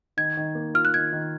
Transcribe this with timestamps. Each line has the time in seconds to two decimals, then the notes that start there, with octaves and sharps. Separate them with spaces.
0.17 D#3 G#6
0.37 D#3
0.55 A#3
0.74 F4 F6
0.85 F#6
0.94 D#3 G#6
1.12 D#3